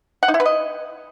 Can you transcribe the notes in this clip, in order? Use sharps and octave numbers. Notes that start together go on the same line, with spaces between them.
F#5
D#4
E4
B4
D#5